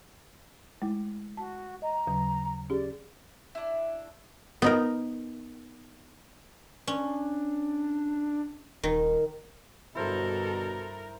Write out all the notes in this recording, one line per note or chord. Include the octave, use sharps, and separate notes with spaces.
G#3 A3 E4
F#4 A5
D#5 A#5
D#2 C#3 F#3
C#4 G4 G#4 D5
D4 E4
B3 D#4 A#4
C#4 D4
D#1 D#3
G2 B2 D3 E4 F#4 A4 A#4 C5